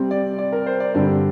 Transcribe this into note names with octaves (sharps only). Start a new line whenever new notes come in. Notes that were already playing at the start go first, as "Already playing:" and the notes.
Already playing: C3 G3 C4
D5
D5
A#4
C5
D5
G2 D3 G3 C4 D5